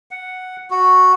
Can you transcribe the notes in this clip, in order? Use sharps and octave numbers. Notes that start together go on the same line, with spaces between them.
F#5
F#4